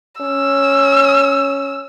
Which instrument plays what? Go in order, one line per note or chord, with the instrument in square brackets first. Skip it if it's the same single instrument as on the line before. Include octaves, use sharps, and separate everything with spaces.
[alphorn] C#4 [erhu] E6